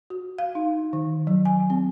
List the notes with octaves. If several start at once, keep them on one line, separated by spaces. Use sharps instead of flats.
F#4
F5
D#4
D#3
F#3
G#5
C4